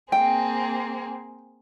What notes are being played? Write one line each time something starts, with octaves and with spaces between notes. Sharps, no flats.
A#3 C4 G#4 G5